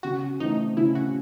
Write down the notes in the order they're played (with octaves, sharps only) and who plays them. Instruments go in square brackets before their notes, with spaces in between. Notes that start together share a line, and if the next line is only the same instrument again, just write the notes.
[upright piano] C#3 [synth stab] F#4
[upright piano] E3 A3 C4 [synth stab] D#4
[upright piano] C#3 [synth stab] E4
[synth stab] F#4